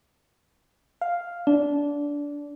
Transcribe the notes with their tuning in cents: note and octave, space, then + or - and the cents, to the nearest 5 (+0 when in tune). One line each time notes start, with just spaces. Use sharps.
F5 +0
D4 -20